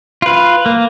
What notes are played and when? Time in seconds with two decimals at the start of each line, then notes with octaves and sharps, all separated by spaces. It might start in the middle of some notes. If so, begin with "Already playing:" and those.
0.22 F4 B4
0.66 A#3